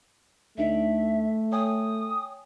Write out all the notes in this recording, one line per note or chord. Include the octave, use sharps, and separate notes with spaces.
D2 A3 D4 D#4 E5
C#5 G5 G#5 D#6